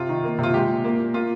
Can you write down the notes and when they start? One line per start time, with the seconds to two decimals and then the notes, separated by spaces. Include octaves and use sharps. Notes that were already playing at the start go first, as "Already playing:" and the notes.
Already playing: C3 F4
0.09 D#3
0.24 A#3
0.39 C3 F4
0.54 G#3 G4
0.69 A#2
0.84 A#3
0.99 A#2
1.14 A#3 F4